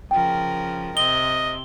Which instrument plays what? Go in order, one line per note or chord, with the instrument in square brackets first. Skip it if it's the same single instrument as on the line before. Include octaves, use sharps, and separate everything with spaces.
[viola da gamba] C#3 F3 A#4 [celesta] G5
[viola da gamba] C3 C4 [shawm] D#5 [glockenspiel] G7